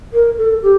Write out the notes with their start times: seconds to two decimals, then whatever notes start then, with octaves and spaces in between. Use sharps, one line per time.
0.13 A#4
0.38 A4
0.63 G4